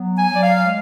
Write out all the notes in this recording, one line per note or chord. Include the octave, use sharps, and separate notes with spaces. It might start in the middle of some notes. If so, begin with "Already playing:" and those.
Already playing: F#3 B3
G#5
F#3
D5
F5
G#3